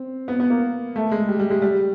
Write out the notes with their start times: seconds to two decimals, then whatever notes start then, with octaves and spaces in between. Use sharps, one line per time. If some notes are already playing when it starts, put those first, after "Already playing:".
Already playing: C4
0.28 B3
0.40 B3
0.50 A#3
0.96 A3
1.11 G#3
1.28 G3
1.39 G3
1.50 G#3
1.62 G3